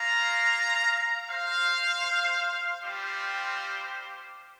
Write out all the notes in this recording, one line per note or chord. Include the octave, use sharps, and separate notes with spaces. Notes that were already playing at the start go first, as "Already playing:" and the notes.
Already playing: A#3 F4 F5 A#5
C5 F5
G3 C4 F4 G4 C5